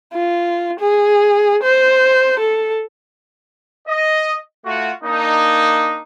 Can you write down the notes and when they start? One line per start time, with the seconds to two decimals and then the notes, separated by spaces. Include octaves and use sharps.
0.14 F4
0.79 G#4
1.64 C5
2.39 A4
3.87 D#5
4.65 A3 F4 F#4
5.04 A#3 D4 D#4